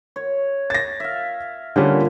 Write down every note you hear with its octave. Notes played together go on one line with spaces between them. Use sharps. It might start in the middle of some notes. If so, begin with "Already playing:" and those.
C#5
A6 A#6
E5 F5
A#2 D3 G3 C#4